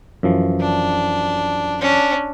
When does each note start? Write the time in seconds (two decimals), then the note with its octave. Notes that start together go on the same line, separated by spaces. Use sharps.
0.23 F#2 E3 F3
0.61 D4
1.81 C#4 D4